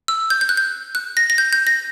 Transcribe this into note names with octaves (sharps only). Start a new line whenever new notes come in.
E6
G6
G6
F#6
G6
F#6
A#6
A#6
G6
G6
A#6